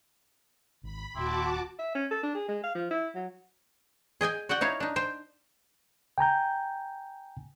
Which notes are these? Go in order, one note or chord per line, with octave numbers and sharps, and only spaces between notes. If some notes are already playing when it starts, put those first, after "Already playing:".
G#1 B5
D#1 A#2 E4 F#4 G4 A5 C6 D6
E5
C#4
A4
D4
G#4
G#3
F5
F3
E4
F#3
G#4 D#5 G5 G#5
F#4 D5 F#5 G5
D#4 E4 C#5 F5
D4 D#4
C5 G5
G5 G#5 A#5 G6